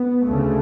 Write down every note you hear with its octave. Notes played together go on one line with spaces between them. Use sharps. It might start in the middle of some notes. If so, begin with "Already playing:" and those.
Already playing: B3
D2 C#3 A3